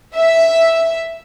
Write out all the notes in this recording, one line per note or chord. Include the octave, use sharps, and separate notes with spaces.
E5